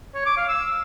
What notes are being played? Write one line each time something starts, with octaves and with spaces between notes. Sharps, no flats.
C#5
D6
F5
E6